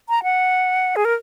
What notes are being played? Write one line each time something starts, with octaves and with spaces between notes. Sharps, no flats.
A#5
F#5
G#4
A#4